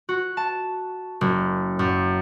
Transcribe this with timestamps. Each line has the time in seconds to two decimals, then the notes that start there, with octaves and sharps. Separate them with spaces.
0.09 F#4
0.37 A5
1.21 F#1
1.79 F#2